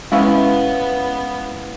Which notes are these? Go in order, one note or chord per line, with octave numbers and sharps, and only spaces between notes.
G#3 B3 C#4 E4 F5